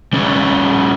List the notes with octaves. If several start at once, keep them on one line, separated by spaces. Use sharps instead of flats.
G3 C#4 B4